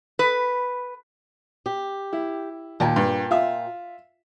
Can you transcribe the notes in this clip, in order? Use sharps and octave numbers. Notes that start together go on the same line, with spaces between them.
B4
G4
E4
D#2 A#2 G5 A5
G2
F4 E5